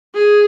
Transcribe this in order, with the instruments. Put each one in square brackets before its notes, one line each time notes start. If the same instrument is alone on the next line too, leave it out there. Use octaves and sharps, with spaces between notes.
[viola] G#4